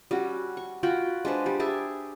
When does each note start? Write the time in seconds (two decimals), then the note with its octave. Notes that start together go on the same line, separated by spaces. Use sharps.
0.11 G3 C#4 F#4
0.57 C#6
0.83 F4 F#4 G5 B5
1.25 G#3 D4 B4 C5
1.46 G3 G4
1.60 G4 G#4 E5 A5